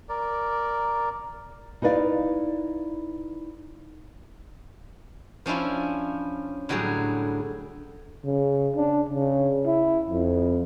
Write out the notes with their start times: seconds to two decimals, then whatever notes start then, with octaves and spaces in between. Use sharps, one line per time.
0.09 A#4 D5
1.82 D#4 E4 B4 D5 F5
5.46 F3 C#4 D4 E4 F4
6.69 A2 D3 F#3 G3 G#4
8.25 C#3
8.76 D4
9.10 C#3
9.66 E4
10.09 F2